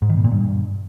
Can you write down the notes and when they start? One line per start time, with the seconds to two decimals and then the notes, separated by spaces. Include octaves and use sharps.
0.02 G#2
0.09 D#3
0.17 B2
0.24 A#2
0.32 G2